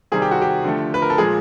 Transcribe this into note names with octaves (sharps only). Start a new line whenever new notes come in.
C3 D#3 G3 C4 G#4
G4
F#4
G4
D3 F3 A3
B4
A#4
A4
A#2 F3 G#3 G#4